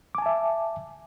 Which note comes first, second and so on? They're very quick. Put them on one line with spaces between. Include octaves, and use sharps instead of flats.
D6 G#5 A5 E5